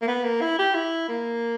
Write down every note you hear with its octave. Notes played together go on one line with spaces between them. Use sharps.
A#3
B3
A#3
E4
G4
E4
A#3